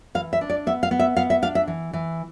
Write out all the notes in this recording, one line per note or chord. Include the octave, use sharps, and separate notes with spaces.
E3 F5
E5
D4
D5
B3 E5
F5
B3
E5
B3 F5
E5
D4 F5
E5
E3
E3